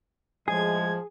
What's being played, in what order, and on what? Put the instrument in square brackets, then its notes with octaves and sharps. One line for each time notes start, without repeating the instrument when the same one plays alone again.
[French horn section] A2 G#3 [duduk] F3 [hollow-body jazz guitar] G#4 [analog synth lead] G#6